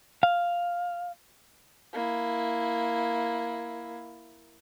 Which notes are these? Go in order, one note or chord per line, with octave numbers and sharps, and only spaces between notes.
F5
A#3 E4